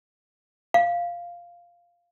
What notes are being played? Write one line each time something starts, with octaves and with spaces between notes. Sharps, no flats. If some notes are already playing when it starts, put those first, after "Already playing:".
F5